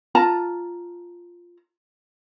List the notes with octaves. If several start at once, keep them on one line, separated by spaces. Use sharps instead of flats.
F4 A5 A#5